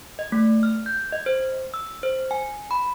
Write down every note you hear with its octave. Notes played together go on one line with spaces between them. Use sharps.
D#5
A3
F6
G6
D#5
C5
E6
C5
G#5
B5